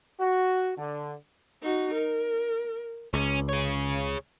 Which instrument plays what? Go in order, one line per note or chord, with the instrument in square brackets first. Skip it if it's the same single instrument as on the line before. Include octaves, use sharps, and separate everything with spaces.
[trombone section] F#4
D3
[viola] D#4 F#4
A#4
[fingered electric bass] C#2 [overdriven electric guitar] C#4
[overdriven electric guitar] G#4 C#5